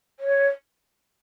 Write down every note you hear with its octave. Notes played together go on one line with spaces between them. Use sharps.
C#5